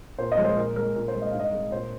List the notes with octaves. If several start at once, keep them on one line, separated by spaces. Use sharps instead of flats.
A#2 C5
D#5
F3 G#3
C5
A#2 A#4
G#3 A#4
A#2 A#4
C5
G#3
D#5
G#2 F5
D#5
G#3
A#2 C5